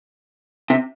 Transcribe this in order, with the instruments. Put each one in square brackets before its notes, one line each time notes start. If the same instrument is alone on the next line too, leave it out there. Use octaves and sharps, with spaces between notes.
[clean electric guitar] C3